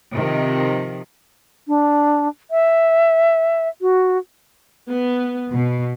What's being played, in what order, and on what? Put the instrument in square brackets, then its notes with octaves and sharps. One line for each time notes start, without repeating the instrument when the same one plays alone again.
[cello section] C3 D#3 F3
[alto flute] D4
E5
F#4
[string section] B3
B2